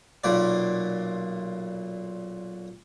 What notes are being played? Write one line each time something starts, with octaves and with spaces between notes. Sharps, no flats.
B1 A#2 D5